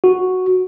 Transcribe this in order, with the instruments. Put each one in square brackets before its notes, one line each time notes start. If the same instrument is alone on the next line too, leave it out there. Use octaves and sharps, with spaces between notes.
[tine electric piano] F#4